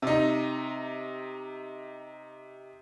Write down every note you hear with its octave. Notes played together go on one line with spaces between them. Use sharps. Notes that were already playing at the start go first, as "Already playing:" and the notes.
C3 D#4